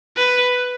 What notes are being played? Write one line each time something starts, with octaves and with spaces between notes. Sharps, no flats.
B4